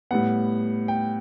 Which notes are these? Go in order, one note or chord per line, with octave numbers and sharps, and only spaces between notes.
A2 G3 B3 F#5
G5